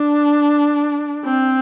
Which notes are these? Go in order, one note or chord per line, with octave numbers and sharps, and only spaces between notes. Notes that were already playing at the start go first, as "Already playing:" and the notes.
Already playing: D4
C4